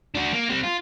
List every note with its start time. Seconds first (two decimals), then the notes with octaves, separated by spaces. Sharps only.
0.15 D4 F#4
0.33 A#3
0.49 G3 C4
0.63 F4